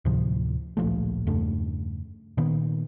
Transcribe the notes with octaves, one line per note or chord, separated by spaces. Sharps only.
D2 A2 C3 F3
D1 A#1 F3 A3
E2 G2 C#3 A3
A#2 D#3 B3